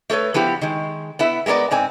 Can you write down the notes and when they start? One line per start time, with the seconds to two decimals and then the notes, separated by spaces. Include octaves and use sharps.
0.10 A3 A4 B4 C#5
0.34 F3 B3 E4 G4
0.61 D#3 G#3
1.19 B3 E4 E5
1.46 G#3 A3 B3 A#4 D5
1.71 G#2 C4 G#5